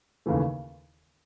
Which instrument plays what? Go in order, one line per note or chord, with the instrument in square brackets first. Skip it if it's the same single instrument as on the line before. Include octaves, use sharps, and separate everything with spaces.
[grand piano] D#2 C#3 E3 A3